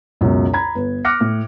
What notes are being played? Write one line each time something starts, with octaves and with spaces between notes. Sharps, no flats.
C#2 F#2 B2
A#5 B5 G#6
G1 B4
D6 F6 F#6 A#6 C#7
A2